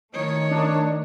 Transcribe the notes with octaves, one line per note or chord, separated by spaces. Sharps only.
D#3 A3 C#5 D#5
D4